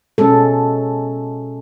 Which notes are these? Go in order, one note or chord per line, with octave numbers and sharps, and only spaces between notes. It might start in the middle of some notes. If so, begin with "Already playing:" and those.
B2 G#3 C#4 A4